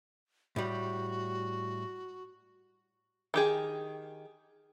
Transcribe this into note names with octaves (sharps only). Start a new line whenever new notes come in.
A2 G3 F#4
D#3 G4 G#4